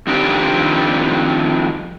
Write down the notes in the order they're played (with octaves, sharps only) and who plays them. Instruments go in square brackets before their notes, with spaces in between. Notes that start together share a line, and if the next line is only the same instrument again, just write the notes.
[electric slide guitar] F2 D#3 G3 C4 D4 G4